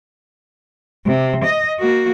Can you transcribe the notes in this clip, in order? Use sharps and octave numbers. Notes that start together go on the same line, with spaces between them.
C3
D#5
A#3 F#4